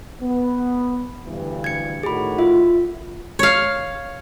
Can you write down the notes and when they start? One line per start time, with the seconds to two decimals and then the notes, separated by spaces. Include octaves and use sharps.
0.21 B3
1.24 D2 G2 E3
1.64 G#6 C#7
2.03 A2 D#3 F#4 G#4 B5
2.38 F4 E5
3.39 C#5 F5